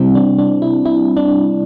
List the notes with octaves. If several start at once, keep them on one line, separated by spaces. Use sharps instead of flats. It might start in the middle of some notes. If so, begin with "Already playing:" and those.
Already playing: C3 G3 C4 E4
D4
D4
E4
E4
D4